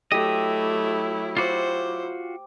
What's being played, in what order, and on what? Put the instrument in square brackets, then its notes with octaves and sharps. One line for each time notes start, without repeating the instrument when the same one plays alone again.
[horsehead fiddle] F#3 E4 [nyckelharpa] A3 [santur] G4 [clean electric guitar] D#5
[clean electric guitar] F4 F#4 [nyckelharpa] C5 [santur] D6